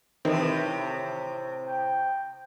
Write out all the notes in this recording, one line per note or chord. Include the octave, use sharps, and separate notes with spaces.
A2 C3 D#3 E3 C4
G5